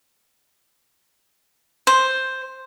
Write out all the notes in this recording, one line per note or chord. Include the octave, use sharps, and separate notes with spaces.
C5